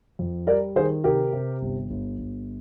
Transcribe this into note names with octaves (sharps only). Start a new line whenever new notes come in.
F2
G3 A#4 D5
D#3 G#4 C5
C3 G4 A#4
C3
G1
G1
G1